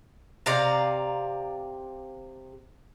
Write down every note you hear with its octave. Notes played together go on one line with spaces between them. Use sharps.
C3 D5 F5 A#5